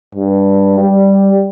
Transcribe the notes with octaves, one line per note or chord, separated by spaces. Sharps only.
G2
G3